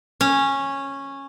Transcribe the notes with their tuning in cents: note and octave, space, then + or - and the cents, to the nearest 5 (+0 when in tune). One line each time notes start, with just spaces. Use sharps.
C#4 -10